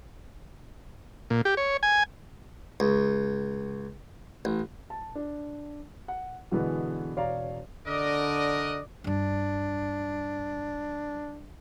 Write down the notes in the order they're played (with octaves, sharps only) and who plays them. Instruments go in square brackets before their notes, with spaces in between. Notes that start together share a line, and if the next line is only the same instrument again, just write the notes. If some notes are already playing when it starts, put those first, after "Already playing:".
[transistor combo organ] A#2
G4
C#5
G#5
[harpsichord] C#2
A1
[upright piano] A5
D4
F#5
B2 D3 E3 G#3 B3
E1 C#5 D5 F5 A#5
[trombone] D3 [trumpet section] F#4 A#4 D#5 [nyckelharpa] D5
[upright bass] G2 G3 [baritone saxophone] D4